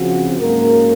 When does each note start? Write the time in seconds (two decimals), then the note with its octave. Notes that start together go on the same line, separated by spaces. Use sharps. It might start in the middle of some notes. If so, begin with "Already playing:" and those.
Already playing: C#3 F3 C4 F#4
0.39 G#2 F#3 A#3 C#4 A#4